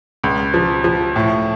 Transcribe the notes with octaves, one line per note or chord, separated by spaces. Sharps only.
C#2
F3
F3
A2